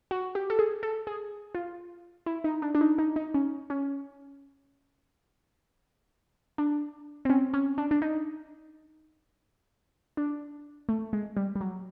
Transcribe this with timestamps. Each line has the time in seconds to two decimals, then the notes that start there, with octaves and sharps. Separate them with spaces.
0.11 F#4
0.35 G4
0.50 A4
0.59 G#4
0.83 A4
1.07 G#4
1.55 F4
2.26 E4
2.44 D#4
2.62 D4
2.75 D4
2.81 D#4
2.98 D#4
3.16 D#4
3.34 C#4
3.70 C#4
6.58 D4
7.25 C4
7.30 C#4
7.54 C#4
7.78 D4
7.91 D4
8.02 D#4
10.17 D4
10.89 A3
11.13 G#3
11.37 G3
11.55 G3
11.61 F#3